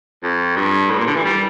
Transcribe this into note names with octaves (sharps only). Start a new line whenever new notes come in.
F2
G2
A2
A#2
D3
E3
G3